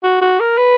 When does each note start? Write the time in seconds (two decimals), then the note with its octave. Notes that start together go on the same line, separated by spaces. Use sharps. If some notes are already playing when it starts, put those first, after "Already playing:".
0.03 F#4
0.22 F#4
0.40 A#4
0.58 B4